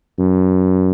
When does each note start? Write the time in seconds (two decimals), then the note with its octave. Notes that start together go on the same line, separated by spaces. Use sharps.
0.19 F#2